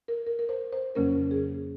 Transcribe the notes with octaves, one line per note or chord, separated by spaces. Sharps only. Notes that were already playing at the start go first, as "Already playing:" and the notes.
A#4
A#4
A#4
C5
C5
F2 C#3 F#3 A#3 C#4 A#4
G#4